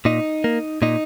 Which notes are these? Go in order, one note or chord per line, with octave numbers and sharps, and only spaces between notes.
A#2 D#4
A#3
A#2 D#4